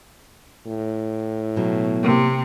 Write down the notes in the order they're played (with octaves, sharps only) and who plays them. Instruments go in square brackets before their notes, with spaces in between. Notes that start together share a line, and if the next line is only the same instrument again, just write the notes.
[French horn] A2
[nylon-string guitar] B2 F#3
[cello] C3 [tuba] A#3